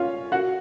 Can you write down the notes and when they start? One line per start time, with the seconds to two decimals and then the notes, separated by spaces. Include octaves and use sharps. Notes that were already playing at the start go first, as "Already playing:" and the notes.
Already playing: C#4 F4 C#5 F5
0.32 F#4 F#5